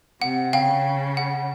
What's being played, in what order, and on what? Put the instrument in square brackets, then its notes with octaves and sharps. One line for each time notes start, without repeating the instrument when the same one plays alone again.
[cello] C3 [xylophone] F#5
[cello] C#3 [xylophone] F5 G5
[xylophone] F#5